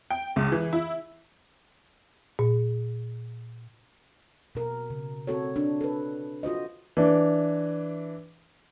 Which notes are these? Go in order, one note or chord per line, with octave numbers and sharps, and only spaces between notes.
G5
C#2
E3
E4
A#2
B2 A#4
C#3
C4 F#4 A4 C#5
D4
A4 B4
F4 F#4 C5 D#5
E3 D4